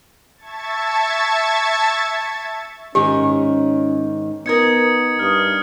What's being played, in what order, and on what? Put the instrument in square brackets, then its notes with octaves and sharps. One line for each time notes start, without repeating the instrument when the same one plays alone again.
[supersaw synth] E5 A5 C#6 G#6 A6
[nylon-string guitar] G#2 D#3 [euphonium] C#4 [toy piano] G4
[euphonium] B3 [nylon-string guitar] D#4 A#4 [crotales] D#6 G#6 C#7
[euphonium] G2 [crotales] D#6 F6